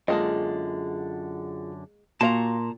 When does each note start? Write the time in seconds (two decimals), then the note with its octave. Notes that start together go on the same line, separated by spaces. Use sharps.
0.08 F#2 D3 G#3 A#3 F4 G#4 D#5 A5
2.21 A#2 F#4 F5 A5 A#5 C6